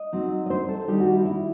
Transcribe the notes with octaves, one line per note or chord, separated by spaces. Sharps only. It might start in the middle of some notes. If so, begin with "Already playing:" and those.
Already playing: D#5
F#3 C4 D#4
D#5
C5
A4
D#3 G3 D#4 G4
F#4
E4
E4